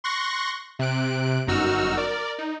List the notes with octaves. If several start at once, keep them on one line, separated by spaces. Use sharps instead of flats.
C6 C#6 F#6 A#6
C3 F#6 D7
G1 F#2 D#4 F#4 E6 F6
A#4 D5
D#4